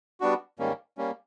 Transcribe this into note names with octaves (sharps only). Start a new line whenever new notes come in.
G3 B3 D4 F#4
G#2 D#3 G3 A#3 C#4
G3 A#3 C#4